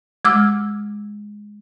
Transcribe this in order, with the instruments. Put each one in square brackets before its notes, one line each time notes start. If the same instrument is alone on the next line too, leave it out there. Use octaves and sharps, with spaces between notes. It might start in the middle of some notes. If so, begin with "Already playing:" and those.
[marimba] G#3 D6 E6 F6